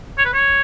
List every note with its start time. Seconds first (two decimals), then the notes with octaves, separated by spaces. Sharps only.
0.18 C#5
0.26 B4
0.34 C#5